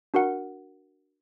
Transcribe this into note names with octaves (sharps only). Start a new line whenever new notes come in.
D4 F#4 A#4 F#5